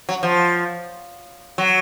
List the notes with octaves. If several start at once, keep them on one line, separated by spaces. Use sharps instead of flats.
F#3
F3
F#3